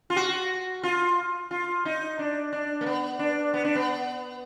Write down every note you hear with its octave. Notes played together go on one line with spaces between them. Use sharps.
F4
F#4
F4
F4
D#4
D4
D4
A#3
B3
D4
B3
D4
B3